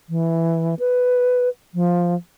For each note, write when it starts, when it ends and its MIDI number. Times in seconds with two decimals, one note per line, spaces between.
0.09 0.75 52
0.79 1.49 71
1.74 2.15 53